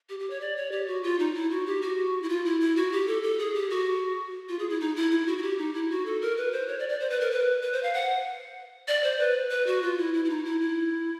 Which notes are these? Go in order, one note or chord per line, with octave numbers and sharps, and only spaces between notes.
G4
G4
C#5
D5
C#5
G4
F#4
F4
D#4
E4
F#4
G4
F#4
E4
F4
E4
E4
F#4
G4
A4
A4
G#4
G4
F#4
F4
G#4
E4
D#4
E4
E4
F#4
F#4
G4
D#4
E4
F#4
A4
A#4
B4
C5
C#5
D5
D5
C5
B4
A#4
B4
B4
C5
F5
F#5
D5
C5
B4
B4
F#4
F4
E4
E4
E4
D#4
E4
E4